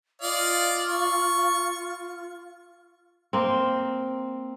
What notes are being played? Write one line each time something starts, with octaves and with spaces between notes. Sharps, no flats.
F4 D5 D#5 F5
C#6
A#3 C4